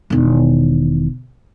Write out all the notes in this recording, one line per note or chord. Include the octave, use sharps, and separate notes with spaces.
E1 D#3